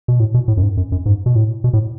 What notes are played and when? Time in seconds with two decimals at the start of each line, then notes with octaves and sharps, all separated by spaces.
0.08 B2
0.19 A2
0.34 B2
0.48 A2
0.57 F#2
0.63 G#2
0.77 F#2
0.92 F#2
1.06 G#2
1.26 B2
1.35 A2
1.64 B2
1.73 A2